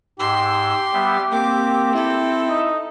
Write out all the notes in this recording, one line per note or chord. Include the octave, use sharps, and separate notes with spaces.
G#2 G4 C6 E6
G3 B3 E5
A#3 C4 D6
E4 A4
D#4